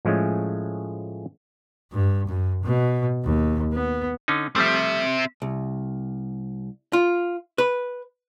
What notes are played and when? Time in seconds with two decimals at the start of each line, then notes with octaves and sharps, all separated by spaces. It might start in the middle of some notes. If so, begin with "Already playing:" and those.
0.05 A2 F3 G#3 A3 C#4
1.92 G2
2.27 F#2
2.63 B2
3.24 D#2
3.73 B3
4.28 D3 C#4 D#4
4.56 F3 G3 A3 C4 E5
5.42 C2
6.93 F4
7.58 B4